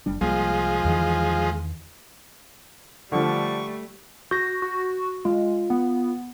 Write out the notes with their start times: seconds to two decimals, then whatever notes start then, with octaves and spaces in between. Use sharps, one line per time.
0.06 F#1 G3 D4
0.21 C2 F3 G3 G#3 A#3
0.85 E2 D#3 E3
3.12 D3 F3 G3 A3 C#6
4.31 F#4 G6 A#6
4.62 F#4
5.25 G#3 F4
5.70 B3